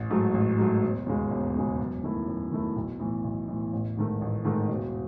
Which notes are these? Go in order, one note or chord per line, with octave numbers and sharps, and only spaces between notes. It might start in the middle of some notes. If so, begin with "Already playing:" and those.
Already playing: A1
G#2 F#3 A3
A1
G#2 F#3 A3
E1
D#2 C#3 G#3
E1
D#2 C#3 G#3
F#2
D#3 A3 E4
F#2
D#3 A3 E4
B1
A2 E3
B1
A2 E3
A1
G#2 D#3 A3
A1
G#2 D#3 A3
E1